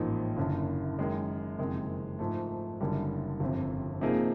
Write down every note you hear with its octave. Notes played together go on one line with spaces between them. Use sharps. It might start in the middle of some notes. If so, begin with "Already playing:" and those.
Already playing: A1 G#2 F3 A#3 D#4
F#1 F#2 D3
F#2 D#3 G#3
F#1 F2 C3 D#3 G#3
G#2 F3 A3
F#1 F#2 D3 G3
G1 F2 C3
C3 F3 A#3 D#4 G#4